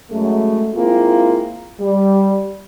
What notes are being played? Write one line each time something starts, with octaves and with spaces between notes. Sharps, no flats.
F#2 G#3 A3
G#3 A#3 C4 E4 F4
G3